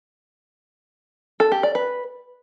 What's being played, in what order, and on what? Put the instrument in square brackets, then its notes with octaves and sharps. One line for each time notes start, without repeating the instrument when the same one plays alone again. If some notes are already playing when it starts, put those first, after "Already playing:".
[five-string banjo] A4
G4
D5
B4